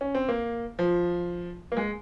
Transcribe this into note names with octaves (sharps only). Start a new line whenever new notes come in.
C#4
C4
A#3
F3
A#3
G#3